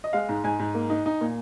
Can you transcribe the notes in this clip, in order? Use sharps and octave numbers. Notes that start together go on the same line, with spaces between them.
D#5
G#3 F5
G#2
G#2 G#5
G#2
A#3
D#4
D#4
A#2